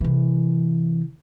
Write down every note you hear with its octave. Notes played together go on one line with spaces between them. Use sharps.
C3 E3